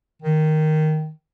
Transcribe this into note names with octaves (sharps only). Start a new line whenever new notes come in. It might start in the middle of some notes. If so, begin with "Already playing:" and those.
D#3